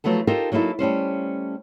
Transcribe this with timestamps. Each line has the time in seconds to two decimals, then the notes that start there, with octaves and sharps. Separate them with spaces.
0.04 F3 F#3 A3 B3 A4
0.27 D#4 F4 G4 A4 A#4 C5
0.52 F#3 A#3 D#4 E4 A4
0.79 G3 A3 C#4 C5